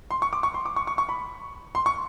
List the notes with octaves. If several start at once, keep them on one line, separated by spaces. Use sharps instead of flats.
C6
C#6
D6
C#6
C6
D6
C#6
C#6
C#6
B5
C6
C#6